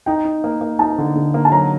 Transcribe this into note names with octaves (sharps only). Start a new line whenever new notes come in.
D#4 G5
D#4
A#3
A#3
D#4 A5
D3
D3
A#3
A5
F#3 A#5